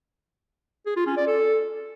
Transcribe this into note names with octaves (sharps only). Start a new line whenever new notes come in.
G#4
F4
C#4
D5
A4